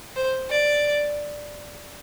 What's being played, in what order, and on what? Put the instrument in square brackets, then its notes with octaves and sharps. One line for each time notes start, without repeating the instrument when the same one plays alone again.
[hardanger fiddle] C5
D5